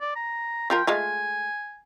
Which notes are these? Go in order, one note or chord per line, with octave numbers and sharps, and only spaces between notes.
D5
A#5
F3 F4 A#4 G5
G#3 A3 F4 G#5